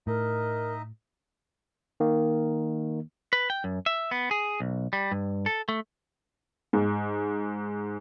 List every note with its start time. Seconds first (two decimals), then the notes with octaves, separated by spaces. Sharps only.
0.07 A2 D#4 A#4 D#5 E5
2.00 D#3 A#3
3.33 B4
3.50 G5
3.64 F#2
3.86 E5
4.11 B3
4.31 G#4
4.60 B1
4.93 G3
5.12 G2
5.46 A4
5.69 A3
6.73 G#2